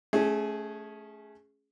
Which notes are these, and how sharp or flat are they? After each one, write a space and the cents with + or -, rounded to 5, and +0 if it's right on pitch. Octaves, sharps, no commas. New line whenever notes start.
A3 -25 C#4 +0 G#4 +0